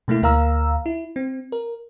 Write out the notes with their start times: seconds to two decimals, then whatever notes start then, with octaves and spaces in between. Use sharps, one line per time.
0.08 B2 A3 A#3 E4
0.22 D2 A#3 A#4 F5 A#5 E6
0.86 E4
1.16 C4
1.52 A#4